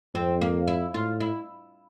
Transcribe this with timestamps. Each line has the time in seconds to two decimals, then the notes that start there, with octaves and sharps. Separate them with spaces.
0.14 F2 C4
0.41 A#3
0.67 E4
0.94 A2 F4
1.20 E4